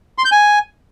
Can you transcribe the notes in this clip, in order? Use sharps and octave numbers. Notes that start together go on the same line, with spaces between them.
C6
G6
G#5